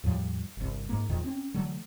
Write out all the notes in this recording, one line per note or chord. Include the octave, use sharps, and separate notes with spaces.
E2 A2 F3 G3
G1 C2
G#2 A#3
E2 A#2 D#3 F3
C4 C#4
D3 E3 F#3 A3